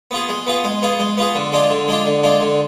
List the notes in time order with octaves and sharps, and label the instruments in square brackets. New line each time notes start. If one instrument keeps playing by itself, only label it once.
[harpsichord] B3 F4 G#4
G#3
B3 F4 G#4
G#3
B3 F4 G#4
G#3
B3 F4 G#4
D3
G#3 D4 F4
D3
G#3 D4 F4
D3
G#3 D4 F4
D3